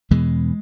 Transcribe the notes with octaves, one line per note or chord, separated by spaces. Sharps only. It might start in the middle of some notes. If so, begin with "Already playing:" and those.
E2 B2 E3 G#3